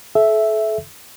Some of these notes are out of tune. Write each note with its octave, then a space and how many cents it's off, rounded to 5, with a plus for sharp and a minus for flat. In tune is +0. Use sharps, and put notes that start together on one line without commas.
A4 -35 E5 +0